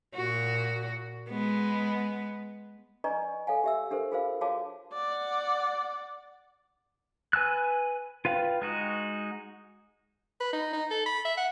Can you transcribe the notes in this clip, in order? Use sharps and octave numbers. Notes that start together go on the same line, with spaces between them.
A#2 F#4
G#3 B3
B4 D5 D#5 G#5 A#5 C#6
A4 C#5 F5 F#5 G#5
G4 E5 E6
D4 G4 A4 A#4 C5
F4 G#4 A#4 C5 F5
F#4 G#4 C#5 F5 A5 D6
D5 F#5
B4 G#5 E6 F#6
F4 B4 F5 G5
G#3 D#4 F#4
B4
D#4
D#4
A4
B5
E5
F#5